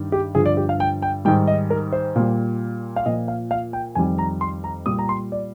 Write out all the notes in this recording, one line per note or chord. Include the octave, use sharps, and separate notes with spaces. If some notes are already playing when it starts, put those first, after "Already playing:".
Already playing: G2 D#3 G3
G4
G2 D3 F3 G#4
D5
G4
F5
G5
G5
G#2 D#3 G3 G5
D#5
A#4
C5
A#2 G3
F5
A#2 F3 D#5
F5
F5
G5
F2 D#3 G3 G#5
A#5
C6
A#5
A#2 G3 D#6
A#5
C6
D5